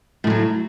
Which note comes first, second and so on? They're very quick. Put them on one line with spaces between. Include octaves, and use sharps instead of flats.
A2 F3 F#3